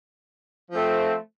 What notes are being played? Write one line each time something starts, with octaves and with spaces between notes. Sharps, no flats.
F3 A3 C4